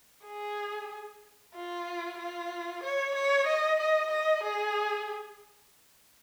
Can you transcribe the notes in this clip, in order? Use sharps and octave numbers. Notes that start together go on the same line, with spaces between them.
G#4
F4
F4
C#5
C#5
D#5
D#5
D#5
G#4